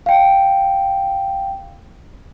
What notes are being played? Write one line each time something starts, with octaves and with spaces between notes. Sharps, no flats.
F5 G5